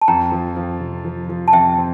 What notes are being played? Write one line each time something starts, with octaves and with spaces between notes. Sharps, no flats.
A5
F2 G5 A#5
F3
F3
C3
F3
F3
A5
F2 E5 G5
C4